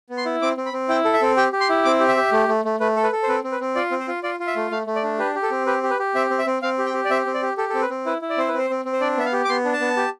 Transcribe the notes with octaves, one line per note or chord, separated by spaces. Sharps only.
B3
C6
E4
C4 D6
C4
B5
C4
E4 G5
A4
E5
C4
G4 G5
G4
C6
E4
C4 D6
G4
E5
G4
A3
A3
A3
A3 B4
A4
B4
A4
C5
C4 B4
C4
B4
C4
F4 D5
C4
C5
F4
F4 D5
F4
E5
A3
A3 F5
A3
D5
D4
G4 B4
G4
A4
C4
G4 B4
G4
B4
G4
C4 E5
C4
E5
C4
C4 F5
G4
G5
G4
D5
C4 E5
C4
D5
G4
G4 A4
C4 A4
B4
C4
E4 B4
E4
D5
C4 C5
C4 B4
C5
C4
C4
C5
D4 D5
B3 E5
F5
G4
D6
B3 C6
D4
A5
B3
G4